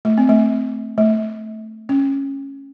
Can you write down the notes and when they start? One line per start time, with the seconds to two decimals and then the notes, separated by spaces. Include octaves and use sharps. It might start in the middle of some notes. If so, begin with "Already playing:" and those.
0.05 A3
0.18 C4
0.29 A3
0.98 A3
1.89 C#4